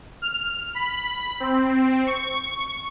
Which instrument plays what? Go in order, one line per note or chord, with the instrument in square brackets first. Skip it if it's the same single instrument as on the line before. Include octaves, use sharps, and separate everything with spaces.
[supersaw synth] F6
B5
C4
C#6